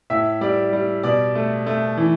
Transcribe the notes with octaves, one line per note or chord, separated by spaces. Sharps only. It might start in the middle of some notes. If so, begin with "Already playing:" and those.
A2 E5
G3 D5
G3
B2 D5
A3
A3
E3